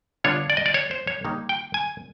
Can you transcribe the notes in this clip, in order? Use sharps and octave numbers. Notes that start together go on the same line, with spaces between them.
D3 G3 B3 D4 F4 C#5
D5
D#5
D5
C#5
C5
C#5
D#3 G3 A#3 D#4
G5
G#5